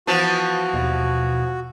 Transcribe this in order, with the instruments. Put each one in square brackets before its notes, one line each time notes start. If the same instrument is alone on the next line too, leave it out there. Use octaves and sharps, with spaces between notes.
[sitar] E3 F3 B3 [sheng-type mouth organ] F#4 [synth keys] A5
[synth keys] D#2 B2